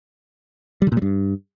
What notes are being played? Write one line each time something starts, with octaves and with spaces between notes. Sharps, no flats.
G3
D3
A#2
G3
G2